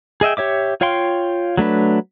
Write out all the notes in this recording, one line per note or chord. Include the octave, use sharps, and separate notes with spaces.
G#4 D#5 E5 G5
G4 C#5 E5 D6
F4 C#5 F5 G5 C6
F#3 A3 D4 B4